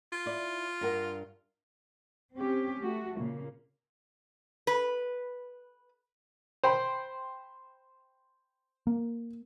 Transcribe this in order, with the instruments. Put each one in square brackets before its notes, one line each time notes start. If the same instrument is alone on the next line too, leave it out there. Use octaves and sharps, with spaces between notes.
[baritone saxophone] F4
[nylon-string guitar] E4 D5
G2 A#4 F#5
[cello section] C4 C#4 G4
A3 F#4
A#2 C#3 A#3
[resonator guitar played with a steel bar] B4
[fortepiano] C5 G5 B5
[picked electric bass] A#3